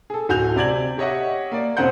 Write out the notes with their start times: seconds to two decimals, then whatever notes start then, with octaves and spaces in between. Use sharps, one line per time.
0.10 G#4 A4
0.29 D1 F#4 G#5 G6 F7
0.56 C3 D5 G#6 F#7
0.98 G4 C#5 D#5 E5 F#5
1.52 A#3 D5
1.77 E1 C4 C#4 C5 F#5 G6